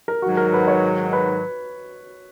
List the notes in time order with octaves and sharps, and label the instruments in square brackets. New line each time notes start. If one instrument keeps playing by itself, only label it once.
[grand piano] A#4
[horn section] G#2 D#3 F#3 [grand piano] F#4
[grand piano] A#4
B4
C#5
B4